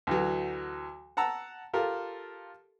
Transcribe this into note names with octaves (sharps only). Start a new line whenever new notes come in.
D2 E3 F#3
F#5 A5 A#5 E6
F4 G4 A4 A#4